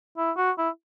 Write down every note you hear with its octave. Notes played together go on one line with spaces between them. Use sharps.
E4
F#4
E4